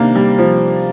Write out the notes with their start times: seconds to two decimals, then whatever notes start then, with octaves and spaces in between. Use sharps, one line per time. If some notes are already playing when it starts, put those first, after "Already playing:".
Already playing: C3 D#3 A#3 D4
0.16 G3
0.39 F3